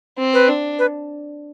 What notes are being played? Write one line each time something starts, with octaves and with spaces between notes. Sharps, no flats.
C4
B4
D4
B4